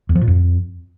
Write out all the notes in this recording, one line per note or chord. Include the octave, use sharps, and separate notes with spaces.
E2
F3
A#2
F2